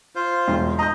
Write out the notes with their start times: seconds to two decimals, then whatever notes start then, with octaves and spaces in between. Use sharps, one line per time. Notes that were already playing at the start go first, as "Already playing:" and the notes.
0.15 F4 C5
0.48 E1
0.79 D#5 A#5 G6